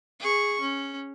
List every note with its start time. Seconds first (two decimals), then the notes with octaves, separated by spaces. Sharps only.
0.20 G#4 C#6
0.61 C#4